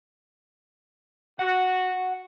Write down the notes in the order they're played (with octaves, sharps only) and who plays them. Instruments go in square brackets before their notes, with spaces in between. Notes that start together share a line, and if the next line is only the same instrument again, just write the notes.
[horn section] F#4 [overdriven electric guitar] F#5